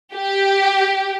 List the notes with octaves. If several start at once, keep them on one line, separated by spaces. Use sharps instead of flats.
G4